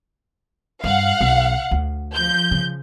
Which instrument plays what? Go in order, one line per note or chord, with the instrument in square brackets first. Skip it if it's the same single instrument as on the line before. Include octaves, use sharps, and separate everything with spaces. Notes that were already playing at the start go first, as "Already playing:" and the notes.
[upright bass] G2 [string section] F5 F#5
[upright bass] B1
D2
[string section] F3 G6
[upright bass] C#3